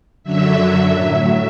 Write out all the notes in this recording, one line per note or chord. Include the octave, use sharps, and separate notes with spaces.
F#2 D3 F#3 E5
A2 F#3